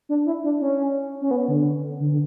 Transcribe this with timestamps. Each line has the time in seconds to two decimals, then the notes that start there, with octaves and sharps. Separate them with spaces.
0.09 D4
0.26 E4
0.44 D4
0.61 C#4
1.21 C#4
1.31 B3
1.48 D3
2.00 D3
2.11 D3